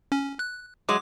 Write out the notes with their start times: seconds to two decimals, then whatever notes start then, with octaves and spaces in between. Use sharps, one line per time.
0.12 C#4
0.39 F#6
0.89 F#3 G#3 D6